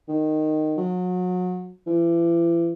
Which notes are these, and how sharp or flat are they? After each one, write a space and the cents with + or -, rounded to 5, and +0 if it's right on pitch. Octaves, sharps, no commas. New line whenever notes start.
D#3 -10
F#3 -30
E3 +40